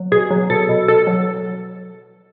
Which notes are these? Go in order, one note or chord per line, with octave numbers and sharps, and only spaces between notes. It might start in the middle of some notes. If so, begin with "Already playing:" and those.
Already playing: F#3
B2 G#4
F#3
B2 A4
B2
B2 A4
F#3